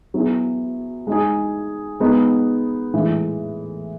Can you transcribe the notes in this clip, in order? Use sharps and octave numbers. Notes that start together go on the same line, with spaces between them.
F#3 B3 E4 G#4
G#3 D#4 G#4
G#3 B3 D#4
A2 E3 G#3